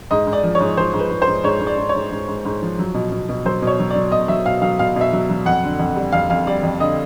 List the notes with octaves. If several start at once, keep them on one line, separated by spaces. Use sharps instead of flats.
G#2 D#5
G#2
D5
F3
C#5
G#2
F3 C5
G#2
B4
G#2
C5
G#2
G#2 C#5
G#2
D5
G#2
C#5
G#2
G#2
G#2
G#2
F3
F#3
B2
B2
B2
F#3 C5
B2 C#5
F#3
D5
F#3
B2 D#5
F#3 E5
B2 F5
F#3 F5
B2 F5
B2 E5
F#3
F#3
F2 F#5
D3
F2
G3
F2 F5
F2 F5
G3 D5
F2
D3 D#5